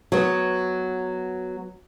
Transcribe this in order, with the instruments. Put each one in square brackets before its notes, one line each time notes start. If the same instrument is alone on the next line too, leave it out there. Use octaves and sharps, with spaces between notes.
[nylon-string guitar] F#3 B3